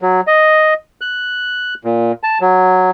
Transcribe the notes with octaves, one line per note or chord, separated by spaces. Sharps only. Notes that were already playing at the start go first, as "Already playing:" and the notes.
F#3
D#5
F#6
A#2
A5
F#3